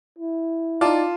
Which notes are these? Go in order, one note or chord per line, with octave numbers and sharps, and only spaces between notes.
E4
D#4 F4 D5 A5